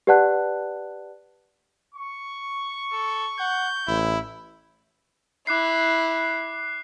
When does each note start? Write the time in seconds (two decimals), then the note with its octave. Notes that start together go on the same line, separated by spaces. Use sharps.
0.07 G4 B4 D5 F#5 A5 F#6
1.95 C#6
2.92 A4
3.39 F#5 G6
3.87 A1 E4
5.47 E4 D6 F#6 C7